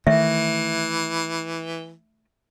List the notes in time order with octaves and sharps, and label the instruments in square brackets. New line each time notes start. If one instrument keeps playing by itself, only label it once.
[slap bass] D#3 A3 [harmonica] E3 [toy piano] E5